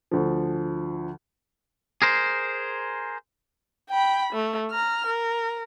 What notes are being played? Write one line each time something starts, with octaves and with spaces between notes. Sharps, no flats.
D2 F3
G#4 A#4 C5
G5 B5
A3
A#5 F6
A#4